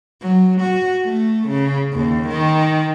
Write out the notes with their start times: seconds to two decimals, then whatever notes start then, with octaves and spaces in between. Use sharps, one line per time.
0.22 F#3
0.61 F#4
1.05 A3
1.49 C#3
1.93 D#2
2.28 D#3